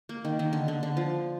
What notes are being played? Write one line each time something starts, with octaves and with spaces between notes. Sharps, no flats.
A#3
D#3
D#3
D3
D3
D3
F3